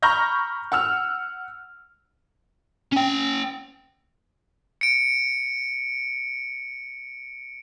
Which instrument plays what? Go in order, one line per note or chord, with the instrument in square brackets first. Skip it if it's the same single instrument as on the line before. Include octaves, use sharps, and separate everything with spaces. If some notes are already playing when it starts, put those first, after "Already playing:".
[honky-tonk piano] A#5 B5 C#6 F6 G6 A#6
F#5 E6 F6
[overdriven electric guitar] C#4 G5
[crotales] C#7 D7